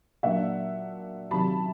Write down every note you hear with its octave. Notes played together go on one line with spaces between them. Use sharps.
A#2 F#3 A#3 D4 E5 F#5
C3 D#3 F#3 A5 B5